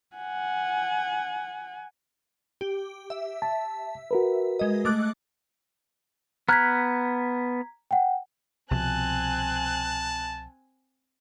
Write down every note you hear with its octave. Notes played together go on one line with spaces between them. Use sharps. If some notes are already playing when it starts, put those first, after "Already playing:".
F#5 G#5
G4
E5
A5
F#4 A#4 B4
G#3 D#5
A3 D6 F#6
B3 A#5 F6 F#6 G#6 B6
F#5 G5
C2 B2 F3 C4 G#5 A5 F#6